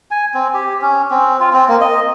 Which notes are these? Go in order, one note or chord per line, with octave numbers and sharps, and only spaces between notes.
G#5
C4
G4
C#4
C4
F4
C4
A#3
D#5